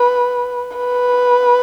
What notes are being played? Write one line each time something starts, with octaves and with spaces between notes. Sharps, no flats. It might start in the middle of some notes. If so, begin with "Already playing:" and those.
Already playing: B4
B4